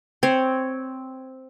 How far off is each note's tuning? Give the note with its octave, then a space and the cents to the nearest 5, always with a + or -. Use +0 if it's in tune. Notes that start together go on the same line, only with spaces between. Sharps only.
C4 +0 C#5 +0